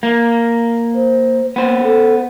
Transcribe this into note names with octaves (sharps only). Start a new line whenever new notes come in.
A#3
C5
A#3 B3 C5
A4